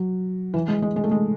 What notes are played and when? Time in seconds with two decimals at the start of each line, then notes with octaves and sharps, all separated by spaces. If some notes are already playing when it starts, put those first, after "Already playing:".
Already playing: F#3
0.54 E3
0.68 G#3
0.82 G#3
0.96 G#3
1.04 A3
1.11 G#3